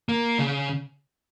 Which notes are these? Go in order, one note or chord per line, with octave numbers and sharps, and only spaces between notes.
A#3
C#3